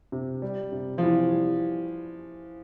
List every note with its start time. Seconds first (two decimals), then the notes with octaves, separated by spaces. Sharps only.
0.12 C3
0.42 G3
0.72 C3
0.98 F3
1.03 C3 E3
1.32 G3